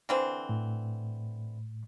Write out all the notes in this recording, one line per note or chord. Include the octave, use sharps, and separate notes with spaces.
D3 E3 C4
A2